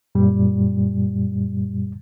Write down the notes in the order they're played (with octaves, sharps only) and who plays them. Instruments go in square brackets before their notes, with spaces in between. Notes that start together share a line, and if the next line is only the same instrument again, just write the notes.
[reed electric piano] F#2 A#2 G3